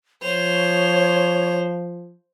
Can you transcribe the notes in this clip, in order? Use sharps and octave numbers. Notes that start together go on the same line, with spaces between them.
F3 C5 C#5 F7